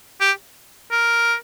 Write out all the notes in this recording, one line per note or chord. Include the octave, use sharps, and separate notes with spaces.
G4
A#4